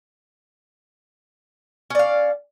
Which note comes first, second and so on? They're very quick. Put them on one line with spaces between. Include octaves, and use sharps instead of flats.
C#4 D5 F5